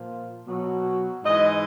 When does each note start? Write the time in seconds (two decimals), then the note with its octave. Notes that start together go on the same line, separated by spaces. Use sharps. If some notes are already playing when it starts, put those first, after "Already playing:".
Already playing: A#2 F3
0.47 B2 F#3
1.23 G#2 E3 D#5